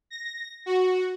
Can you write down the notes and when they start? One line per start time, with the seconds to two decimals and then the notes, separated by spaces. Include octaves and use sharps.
0.10 A#6
0.66 F#4